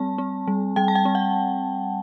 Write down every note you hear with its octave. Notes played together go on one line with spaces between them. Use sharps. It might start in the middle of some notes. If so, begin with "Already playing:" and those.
Already playing: G3 C4 A5
C4
G3
G3 G5
A5
G5
C4
F#5